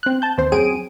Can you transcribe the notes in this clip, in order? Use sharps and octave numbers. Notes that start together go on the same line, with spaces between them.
C4 F#6
A5 G6
D#2 C4 C5
F#2 F#3 C4 G#4 D7 D#7